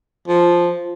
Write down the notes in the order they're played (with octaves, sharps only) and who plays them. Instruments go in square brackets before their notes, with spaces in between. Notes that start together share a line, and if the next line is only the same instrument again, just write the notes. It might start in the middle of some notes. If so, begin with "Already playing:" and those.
[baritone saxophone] F3